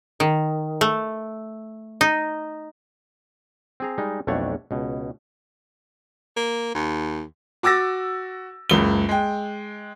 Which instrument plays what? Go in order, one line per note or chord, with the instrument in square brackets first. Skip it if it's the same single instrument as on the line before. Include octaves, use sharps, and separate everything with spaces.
[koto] D#3
A3
D#4
[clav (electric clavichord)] C4 G#4 A#5
G3 G#3 D#4
B1 F2 A3 D4 C#5 F#5
C#2 B2
[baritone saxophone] A#3
D#2
[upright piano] F#4 D6 E6 A6 A#6
F#1 C#2 G7
G#3 G5